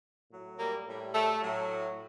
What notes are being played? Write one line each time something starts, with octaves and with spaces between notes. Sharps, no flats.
A2 F#3
G3 A#3
A2 G3
A3
A2 F#3